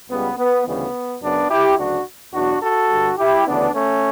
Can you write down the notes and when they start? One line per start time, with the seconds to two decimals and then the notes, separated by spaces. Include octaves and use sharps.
0.10 C#2 C#3 G3 B3
0.38 B3
0.66 D2 C#3 E3 G3 B3
1.21 F#2 C#3 F#3 B3 D4
1.49 E4 G4
1.78 D2 C#3 F#3 D4 F#4
2.34 E2 B2 F#3 D4 F#4
2.62 F#4 A4
2.90 G2 D3 G3
3.18 E4 G4
3.46 D2 C#3 E3 B3 D4
3.74 A3 C#4